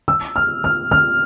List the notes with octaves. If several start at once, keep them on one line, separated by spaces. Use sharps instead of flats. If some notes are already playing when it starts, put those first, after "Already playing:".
E6
F6
F6
F6